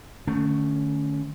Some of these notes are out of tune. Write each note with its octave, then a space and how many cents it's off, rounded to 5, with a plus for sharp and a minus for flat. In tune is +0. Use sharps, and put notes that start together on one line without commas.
D3 +30 A3 +0 C#4 +15